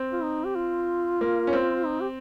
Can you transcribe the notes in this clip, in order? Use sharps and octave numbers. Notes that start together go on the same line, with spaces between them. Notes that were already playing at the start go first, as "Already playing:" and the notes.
Already playing: C4
F4
D#4
G4
F4
A#3
C#4
C4
D#4
G4